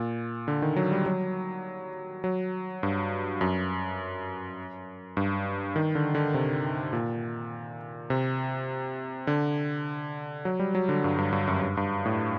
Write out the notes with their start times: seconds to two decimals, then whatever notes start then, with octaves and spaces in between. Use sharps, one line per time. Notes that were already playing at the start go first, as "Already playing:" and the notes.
Already playing: A#2
0.48 D3
0.62 D#3
0.76 F#3
0.92 G3
1.06 F#3
2.24 F#3
2.83 G2
3.41 F#2
5.17 G2
5.76 D#3
5.95 D3
6.15 D3
6.34 C3
6.93 A#2
8.10 C3
9.27 D3
10.45 F#3
10.59 G3
10.75 F#3
10.89 D3
11.04 G2
11.18 G2
11.33 G2
11.47 F#2
11.62 G2
11.77 G2
12.05 A2